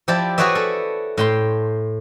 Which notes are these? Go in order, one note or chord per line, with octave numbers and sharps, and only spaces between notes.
F3 E4 G4 D5 A5
F#4 G#4 B4 C#5 D5 E5
A4
A2 G5 C6